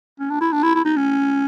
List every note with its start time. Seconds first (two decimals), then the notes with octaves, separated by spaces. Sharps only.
0.20 C#4
0.30 D4
0.41 E4
0.52 D4
0.63 E4
0.75 E4
0.85 D#4
0.97 C#4